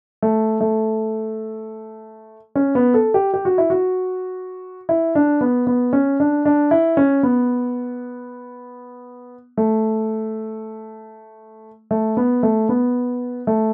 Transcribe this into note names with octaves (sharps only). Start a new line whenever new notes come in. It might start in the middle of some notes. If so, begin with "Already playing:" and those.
A3
A3
C#4
B3
A4
G4
G4
F#4
E4
F#4
E4
D4
B3
B3
C#4
D4
D4
E4
C#4
B3
A3
A3
B3
A3
B3
A3